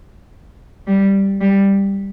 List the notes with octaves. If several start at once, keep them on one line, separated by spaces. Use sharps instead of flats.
G3
G3